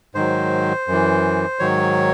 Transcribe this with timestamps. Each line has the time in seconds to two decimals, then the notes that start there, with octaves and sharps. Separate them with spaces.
0.15 G#2 D#3 F#3 C5
0.87 F#2 E3
1.59 G#2 D#3 F#3 C#5